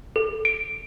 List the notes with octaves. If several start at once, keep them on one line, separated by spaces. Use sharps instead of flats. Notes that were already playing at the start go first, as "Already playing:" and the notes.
A4
D7